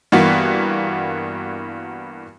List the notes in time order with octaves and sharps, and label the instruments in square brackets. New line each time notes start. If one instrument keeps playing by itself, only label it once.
[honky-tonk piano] G2 E3 A#3 B3 F#4